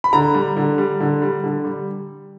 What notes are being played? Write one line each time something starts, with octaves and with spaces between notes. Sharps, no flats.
B5
D3 A#5
G3
D3
G3
D3
G3
D3
G3